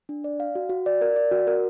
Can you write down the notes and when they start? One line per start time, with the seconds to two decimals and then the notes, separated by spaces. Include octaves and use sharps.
0.09 D4
0.24 D5
0.40 F5
0.55 F#4
0.70 F#4
0.86 D5
1.02 A#4
1.16 D5
1.31 F#4
1.47 A#4